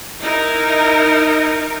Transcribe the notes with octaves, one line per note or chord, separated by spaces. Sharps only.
D#4 E4 A#4